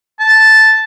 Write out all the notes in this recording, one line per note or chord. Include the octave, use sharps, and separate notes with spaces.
A5